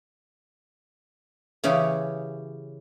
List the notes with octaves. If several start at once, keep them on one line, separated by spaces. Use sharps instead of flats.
C#3 E3 G4 G#4 C#5